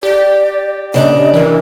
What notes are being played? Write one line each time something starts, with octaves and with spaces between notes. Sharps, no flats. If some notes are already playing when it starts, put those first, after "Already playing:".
G4 D5
C#3 D4 D5 D#5
E3 A#4